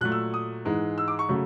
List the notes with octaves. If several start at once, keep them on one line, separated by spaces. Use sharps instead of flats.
A#2 F#3 A3 F#6
E6
D#6
G#2 E3 G#3
E6
D6
C#6
C#3 F#3 A3